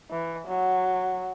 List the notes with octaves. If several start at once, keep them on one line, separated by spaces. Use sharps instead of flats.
E3
F#3